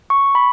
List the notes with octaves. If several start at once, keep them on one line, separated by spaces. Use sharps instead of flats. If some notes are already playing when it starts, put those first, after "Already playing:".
C#6
B5